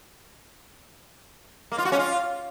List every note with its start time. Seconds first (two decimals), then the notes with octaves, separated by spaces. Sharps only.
1.72 A#3
1.78 F4
1.85 F#4
1.92 C#4
1.99 F4